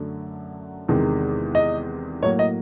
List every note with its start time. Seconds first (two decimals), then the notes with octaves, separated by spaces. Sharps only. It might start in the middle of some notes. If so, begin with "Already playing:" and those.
Already playing: F#2 D3 F#3 A3
0.89 E2 C3 D#3 G#3
1.55 D#5
2.22 A2 F#3 A#3 C#5
2.39 D#5